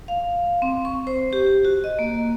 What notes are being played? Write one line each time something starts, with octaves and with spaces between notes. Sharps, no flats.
F5
C4
C#6
C5
G4
F#4
D#5
A#3